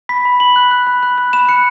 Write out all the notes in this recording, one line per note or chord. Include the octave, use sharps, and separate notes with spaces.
B5 B6
B5
B5 F#7
F#6
F#6
B5
F#6
F#6
B5 E7
F#6 C#7